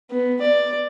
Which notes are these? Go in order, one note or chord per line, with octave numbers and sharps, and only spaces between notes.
B3
D5